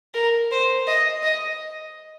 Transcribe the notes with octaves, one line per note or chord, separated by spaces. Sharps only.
A#4
C5
D#5
D#5